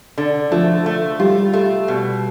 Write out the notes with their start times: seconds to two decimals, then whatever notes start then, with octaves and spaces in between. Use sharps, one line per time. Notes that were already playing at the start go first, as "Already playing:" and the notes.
0.18 D3
0.51 F3 A3
0.86 A3
1.19 G3 F4
1.53 A3
1.88 B2